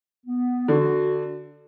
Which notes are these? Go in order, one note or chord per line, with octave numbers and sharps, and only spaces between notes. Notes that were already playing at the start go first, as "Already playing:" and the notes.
B3
D3 F#4